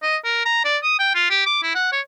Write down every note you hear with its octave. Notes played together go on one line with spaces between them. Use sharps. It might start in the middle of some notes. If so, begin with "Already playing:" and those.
D#5
A#4
A#5
D5
D#6
G5
F4
G4
D6
E4
F#5
C#5